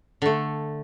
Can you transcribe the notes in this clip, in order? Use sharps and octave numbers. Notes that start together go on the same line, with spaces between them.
D3 A3